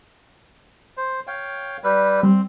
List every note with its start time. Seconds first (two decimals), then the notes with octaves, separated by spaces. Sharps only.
0.97 C5
1.27 C#5 F5 G5
1.84 G3 B4
2.23 G3 C4